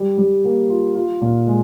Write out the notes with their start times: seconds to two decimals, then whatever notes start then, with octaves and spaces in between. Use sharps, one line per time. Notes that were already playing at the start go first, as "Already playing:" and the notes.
Already playing: G3
0.18 G3
0.44 A#3
0.69 F4
0.95 F4
1.21 A#2
1.47 G#3